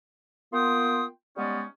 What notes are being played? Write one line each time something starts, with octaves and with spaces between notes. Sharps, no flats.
A#3 B3 F4 G5 C6 D#6
G3 G#3 B3 C#4 D#4 D5